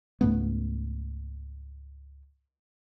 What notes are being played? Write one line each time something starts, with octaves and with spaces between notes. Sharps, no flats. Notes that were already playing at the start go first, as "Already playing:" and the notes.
C#2 G#2 A3 B3